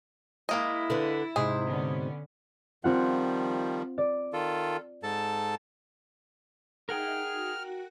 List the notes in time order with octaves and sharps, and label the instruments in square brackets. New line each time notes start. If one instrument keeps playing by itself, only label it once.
[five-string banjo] G#3 A#3 D#5 [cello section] E4
[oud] D3 B4
[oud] G#2 C3 [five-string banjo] G#4
[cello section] D3 B3 C#4
[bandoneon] D#3 F3 G3 [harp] C4 F4 F#5
[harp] D5
[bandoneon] D#3 F4 A4
G#2 A4 A5
[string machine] D#4 E5 [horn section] G#4 [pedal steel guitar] A#4 F#5 G5 [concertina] F6
[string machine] F#4 F#6